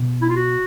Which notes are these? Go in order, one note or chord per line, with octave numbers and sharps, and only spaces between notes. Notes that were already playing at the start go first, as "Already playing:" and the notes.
Already playing: B2
E4
F4
F#4